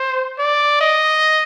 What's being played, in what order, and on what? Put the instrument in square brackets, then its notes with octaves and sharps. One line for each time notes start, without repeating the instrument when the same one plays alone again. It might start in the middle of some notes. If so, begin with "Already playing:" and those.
Already playing: [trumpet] C5
D5
D#5